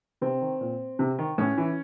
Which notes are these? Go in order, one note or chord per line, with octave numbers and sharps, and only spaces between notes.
C3 C4
D#3
A#2
C3
D#3
A2 C#4
E3